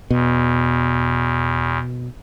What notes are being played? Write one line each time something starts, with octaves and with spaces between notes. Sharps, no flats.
E2 B2